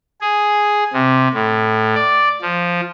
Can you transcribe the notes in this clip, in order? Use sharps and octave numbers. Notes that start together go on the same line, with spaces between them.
G#4
C3
A2
D5
F3